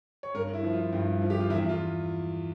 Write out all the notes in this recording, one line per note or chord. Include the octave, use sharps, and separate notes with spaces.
C#5
G2 A#4
E4
F3
F4
G2
F3
G4
F4
E2 E4
F4